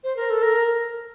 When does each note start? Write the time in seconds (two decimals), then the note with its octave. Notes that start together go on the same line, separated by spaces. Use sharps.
0.04 C5
0.16 A#4
0.30 A4
0.43 A#4